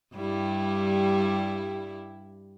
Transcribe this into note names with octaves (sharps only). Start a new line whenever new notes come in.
G2 G3 E4